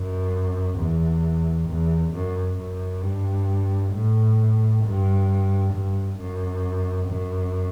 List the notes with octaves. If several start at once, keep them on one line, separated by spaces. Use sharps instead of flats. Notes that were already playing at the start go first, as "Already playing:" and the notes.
Already playing: F#2
E2
E2
F#2
F#2
G2
A2
G2
G2
F#2
F#2